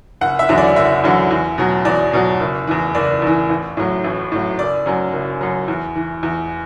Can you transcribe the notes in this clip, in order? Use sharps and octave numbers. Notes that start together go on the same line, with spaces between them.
F#1 F#5
E5
E2 D3 F#3
D5
F#1 E5
E2 D3 F#3
E2
B2 F#3
E2 D5
B2 F#3
F#1
E2 E3
F#1 D5
E2 E3
A1
A2 F#3
A1
A2 F#3
F#1 D5
F#2 F#3
F#1
F#2 F#3
E2
E3
E2